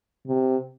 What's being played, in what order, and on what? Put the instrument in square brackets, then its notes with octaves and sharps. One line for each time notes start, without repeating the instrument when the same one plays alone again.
[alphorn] C3